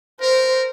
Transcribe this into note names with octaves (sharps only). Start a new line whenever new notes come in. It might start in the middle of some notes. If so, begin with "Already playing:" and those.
A#4 C5